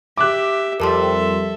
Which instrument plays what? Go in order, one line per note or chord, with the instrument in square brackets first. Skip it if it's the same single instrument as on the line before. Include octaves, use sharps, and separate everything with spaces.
[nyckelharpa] G4 E5 [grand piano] D6 F#6
[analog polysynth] F2 G3 [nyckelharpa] A4 E5 [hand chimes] A#4 A5 C6